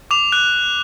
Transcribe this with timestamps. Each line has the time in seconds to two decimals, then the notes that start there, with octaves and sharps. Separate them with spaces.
0.11 D6 F7
0.32 F#6